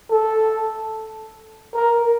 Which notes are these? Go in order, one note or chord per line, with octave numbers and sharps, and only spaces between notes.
A4
A#4